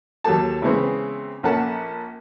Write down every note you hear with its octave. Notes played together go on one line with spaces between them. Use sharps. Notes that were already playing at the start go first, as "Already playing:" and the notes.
D#2 F#3 G4 A4 A5
C#3 E3 G#3 B3 C4
A#1 A#3 C#4 A4 F#5 A5